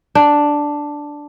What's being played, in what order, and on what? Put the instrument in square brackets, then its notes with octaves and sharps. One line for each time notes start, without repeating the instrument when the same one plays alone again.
[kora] D4